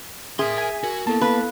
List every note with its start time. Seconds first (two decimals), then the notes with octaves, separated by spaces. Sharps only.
0.39 G#4 A#4 E5 C6
0.58 G#5 B6
0.83 F#4 A#4
1.07 A#3 B3 E4 A4 A5
1.21 B4 F5